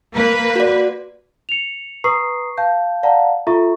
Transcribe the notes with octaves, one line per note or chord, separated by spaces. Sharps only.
A#3 B4
F#4 D5
C#7 F7
B4 A#5 C#6 D#6 C7
F5 A5 G6
D5 F5 F#5 A5 A#5
F4 A4 E5 A#5 C#6